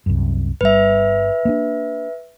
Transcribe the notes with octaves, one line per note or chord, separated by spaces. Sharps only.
C2 F#2
G1 G3 B4 E5
A#3 C4 D4